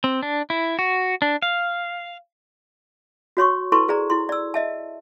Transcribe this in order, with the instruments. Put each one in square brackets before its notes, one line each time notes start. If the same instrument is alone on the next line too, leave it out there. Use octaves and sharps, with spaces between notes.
[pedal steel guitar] C4
D4
E4
F#4
D4
F5
[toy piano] F#4 C#5 C6 C#6
E4 A4 B4 A5 C6 C#6
G#4 C5 D5 A#5
E4 C6
D5 E6
D#5 E5 A5